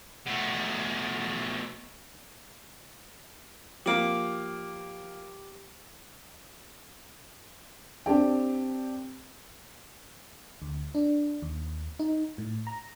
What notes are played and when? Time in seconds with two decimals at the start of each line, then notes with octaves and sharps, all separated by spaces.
0.26 B2 A3
3.86 F3 A#3 G4 D6
8.06 C4 D4 G4 G5
10.62 D2
10.95 D4
11.42 D#2
11.99 D#4
12.38 A2
12.67 A#5